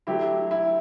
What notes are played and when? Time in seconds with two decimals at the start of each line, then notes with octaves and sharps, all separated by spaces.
0.07 D3 F#3 A3 E4 G4
0.51 E4